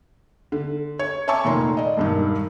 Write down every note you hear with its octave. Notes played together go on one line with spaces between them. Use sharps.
D3
C#5
C#5 E5 G#5 A5 C#6 D6
F1 A#2 D#3 A#5 C6
D5 D#5
E1 G2 D#3